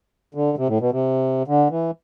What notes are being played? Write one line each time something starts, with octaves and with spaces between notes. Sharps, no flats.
D3
C3
A2
B2
C3
D3
E3